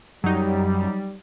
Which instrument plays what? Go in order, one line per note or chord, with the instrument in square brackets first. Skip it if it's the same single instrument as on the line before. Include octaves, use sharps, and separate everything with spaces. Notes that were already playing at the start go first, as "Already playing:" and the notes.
[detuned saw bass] F#2 [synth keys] F#3 D#4 [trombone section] G3